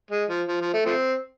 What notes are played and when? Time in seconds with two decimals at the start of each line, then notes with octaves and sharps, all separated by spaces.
0.11 G#3
0.29 F3
0.48 F3
0.61 F3
0.74 A3
0.86 F3 A3 C4